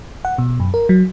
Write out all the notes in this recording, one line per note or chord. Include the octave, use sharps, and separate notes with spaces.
F#5
B2
F#2
A#4
F#3